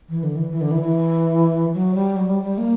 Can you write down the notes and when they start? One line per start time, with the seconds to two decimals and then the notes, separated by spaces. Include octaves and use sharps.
0.09 E3
0.23 D3
0.36 E3
0.50 E3
0.61 D3
0.71 E3
0.81 E3
1.74 F#3
1.94 G3
2.16 F#3
2.29 G3
2.43 G3
2.58 A#3